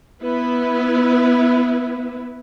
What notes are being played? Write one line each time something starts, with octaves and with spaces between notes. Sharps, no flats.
B3 E4 B4